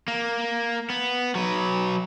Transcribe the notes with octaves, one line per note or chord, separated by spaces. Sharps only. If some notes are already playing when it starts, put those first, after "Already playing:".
A#3
B3
F#3 B4